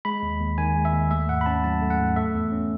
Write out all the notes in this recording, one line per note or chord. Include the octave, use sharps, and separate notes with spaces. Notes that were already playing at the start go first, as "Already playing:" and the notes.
G#3 B5
D#2
D#2
D#3 G#5
G#3
E5
D#2
A3 E5
G#2 F#5
B5
C#4 A5
F#3 A5
A3
F#5
G#2
A3 E5
E2
C#4